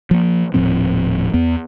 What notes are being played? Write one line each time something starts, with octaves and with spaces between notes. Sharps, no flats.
F3 A#3
D#1 A2 F3 C4
E2 B3